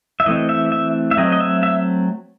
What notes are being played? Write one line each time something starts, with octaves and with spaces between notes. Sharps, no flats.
E5
E3 A3 C4 D#5
E5
E5
E5
F#3 A3 C4 D#5
D#5
E5
E5